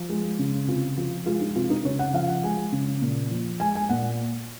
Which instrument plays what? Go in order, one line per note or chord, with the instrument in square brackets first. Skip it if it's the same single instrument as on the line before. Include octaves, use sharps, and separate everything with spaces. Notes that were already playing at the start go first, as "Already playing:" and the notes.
Already playing: [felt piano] F3
G#3
C#3
C3 F4
F3 F4
G#3 F4
D#4
C3 F4
D#4
C#3 C#5
F#5
F3 F5
F#5
G#3 G#5
C#3
A#2
F3
G#3 G#5
G#5
A#2 F#5